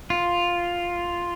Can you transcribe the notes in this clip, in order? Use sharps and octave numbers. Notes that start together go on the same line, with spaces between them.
F4